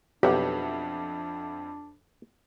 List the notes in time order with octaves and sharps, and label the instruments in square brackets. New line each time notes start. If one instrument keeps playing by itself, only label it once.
[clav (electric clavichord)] B1 [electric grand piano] F2 E5 F#5 [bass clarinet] D4 [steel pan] G4